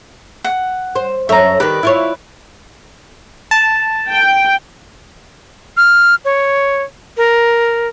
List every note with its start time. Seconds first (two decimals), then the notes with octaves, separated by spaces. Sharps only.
0.44 F#5
0.95 C5
1.29 F#2 A4 C#5 E5 A#5
1.60 D#3 G4 B4 D5
1.83 E4 F4 C#5
3.51 A5
4.10 G5
5.77 F6
6.25 C#5
7.17 A#4